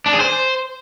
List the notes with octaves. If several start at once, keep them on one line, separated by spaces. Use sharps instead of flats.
D4
G#4
C5